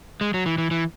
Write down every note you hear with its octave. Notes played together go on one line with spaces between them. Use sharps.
G#3
F#3
E3
E3
E3